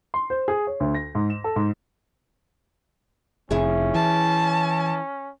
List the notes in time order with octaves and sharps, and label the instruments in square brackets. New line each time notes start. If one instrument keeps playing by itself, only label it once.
[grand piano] C6
C5
G#4
C#5
D2
A#6
G#2
E7
A4
G#2
[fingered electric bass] F1 [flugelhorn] C#4 [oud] E4 G#4
[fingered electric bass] E3 [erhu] A5